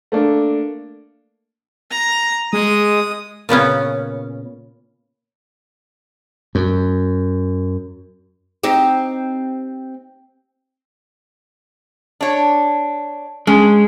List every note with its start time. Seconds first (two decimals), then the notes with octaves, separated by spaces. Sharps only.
0.12 A3 A#3 D4
1.91 A#5
2.53 G#3 D#6
3.49 A#2 C#3 B3 C#4
6.55 F#2
8.64 C4 D#4 G4
12.21 D4 C#5
13.47 G#3 C#4